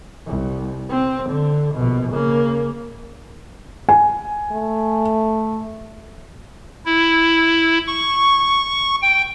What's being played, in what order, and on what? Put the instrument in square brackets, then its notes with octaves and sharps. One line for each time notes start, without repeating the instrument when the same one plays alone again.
[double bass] C2
C4
D3
A#1 B2
C#3 A#3
[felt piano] G#5
[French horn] A3
[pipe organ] E4
C#6
G5